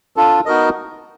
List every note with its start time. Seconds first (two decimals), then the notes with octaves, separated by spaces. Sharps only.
0.16 D4 F4 A4
0.46 B3 D#4 F#4 A#4 D#5